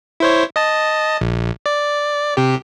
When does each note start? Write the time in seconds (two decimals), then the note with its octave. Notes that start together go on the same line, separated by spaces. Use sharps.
0.20 E4 C5 C#5
0.56 D#5 A5
1.21 A#1
1.66 D5
2.37 C3 G4